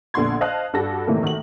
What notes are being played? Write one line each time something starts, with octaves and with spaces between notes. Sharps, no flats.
A#1 D3 B3 F#5 C6 G#6
C5 D#5 F5 A5 D#6 F#6
G2 F#4 G4 A4 A#6
A2 C3 D#3 E3 A3 A#3
D#3 A3 F#4 F#7